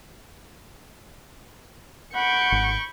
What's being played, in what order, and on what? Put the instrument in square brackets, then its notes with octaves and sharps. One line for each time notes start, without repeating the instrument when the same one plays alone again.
[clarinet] F#5 [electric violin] B5 D7 [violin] C#6 G6
[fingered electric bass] G#1